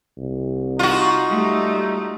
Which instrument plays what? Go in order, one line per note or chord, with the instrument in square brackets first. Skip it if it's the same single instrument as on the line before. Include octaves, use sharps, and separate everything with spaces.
[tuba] C2
[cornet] D#4 [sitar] F4 F#4
[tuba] G3 [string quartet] A3